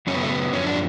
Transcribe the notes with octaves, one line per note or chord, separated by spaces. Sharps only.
F#2 C#3 F#3 C#4
B3
A3
B3
F#2 D3 F3 C#4
D4